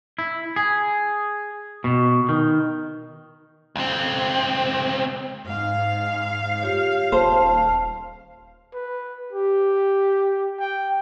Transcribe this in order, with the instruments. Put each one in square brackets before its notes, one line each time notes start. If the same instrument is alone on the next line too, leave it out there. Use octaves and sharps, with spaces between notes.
[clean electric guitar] E4
G#4
B2
D#3
[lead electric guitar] C#2 C4
[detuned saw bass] G#2 [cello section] F5
[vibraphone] F4 G4 C#5
[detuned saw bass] D#1 [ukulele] C5 [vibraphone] A5
[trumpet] B4
G4
G5